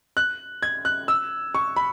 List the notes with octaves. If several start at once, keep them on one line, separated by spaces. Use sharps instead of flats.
F#6
G#6
F#6
E6
C#6
B5